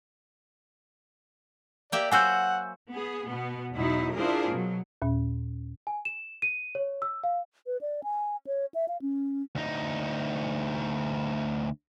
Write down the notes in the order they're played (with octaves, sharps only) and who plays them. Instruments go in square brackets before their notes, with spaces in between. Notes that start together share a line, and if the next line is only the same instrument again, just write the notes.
[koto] A#3 G4 E5 [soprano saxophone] D5
[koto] F#3 F#4 C5 [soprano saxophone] F#5 [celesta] G#5 E6 G6
[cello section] B3 G#4
B2 B3
E2 B2 F#3 D#4 E4
D4 E4 F4 G#4 A#4 C5
B2 F#3
[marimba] D#2 A#2 C#4
[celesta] G#5
E7
D#7
C#5
E6
F5
[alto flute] B4
D5
G#5
C#5
E5
F5
C#4
[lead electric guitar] D2 D#4